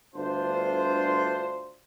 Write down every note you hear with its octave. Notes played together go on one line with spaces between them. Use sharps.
G1 D2 D4 F4 C5